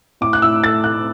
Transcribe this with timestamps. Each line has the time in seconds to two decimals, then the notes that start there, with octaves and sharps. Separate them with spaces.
0.21 A2 D6
0.33 F#6
0.42 A2 E6
0.63 A3 A6
0.84 A3 F#6